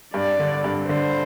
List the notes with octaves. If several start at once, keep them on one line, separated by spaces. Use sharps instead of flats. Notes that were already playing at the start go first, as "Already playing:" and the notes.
G2 D5
D3
G2
D3 C5